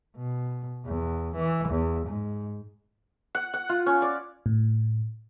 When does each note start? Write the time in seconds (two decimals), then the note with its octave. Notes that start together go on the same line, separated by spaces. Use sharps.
0.16 B2
0.85 E2
1.36 E3
1.69 E2
2.07 G#2
3.35 F#5
3.54 F#5
3.69 F4
3.86 C#4
4.02 D5
4.46 A2